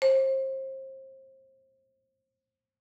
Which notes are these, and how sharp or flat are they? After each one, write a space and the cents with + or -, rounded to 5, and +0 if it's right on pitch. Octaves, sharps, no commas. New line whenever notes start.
C5 +30